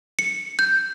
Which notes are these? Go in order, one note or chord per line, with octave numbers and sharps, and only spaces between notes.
C#7
G6